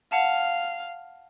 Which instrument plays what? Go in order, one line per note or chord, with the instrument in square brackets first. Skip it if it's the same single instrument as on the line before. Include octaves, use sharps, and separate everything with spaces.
[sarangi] F5 [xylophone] F#5 A5